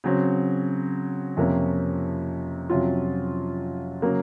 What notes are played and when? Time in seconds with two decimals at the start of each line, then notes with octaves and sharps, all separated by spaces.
0.04 C#3 F#3 C4
1.37 F2 C3 F3 A#3 C#4
2.70 F2 C3 F#3 C#4 F4
4.02 C#3 F#3 A#3